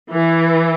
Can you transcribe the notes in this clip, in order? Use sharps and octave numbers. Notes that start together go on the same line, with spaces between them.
E3